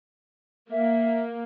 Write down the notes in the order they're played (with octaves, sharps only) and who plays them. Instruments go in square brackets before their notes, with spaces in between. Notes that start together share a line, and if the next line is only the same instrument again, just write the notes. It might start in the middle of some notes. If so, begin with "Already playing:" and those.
[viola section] A#3 [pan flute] E5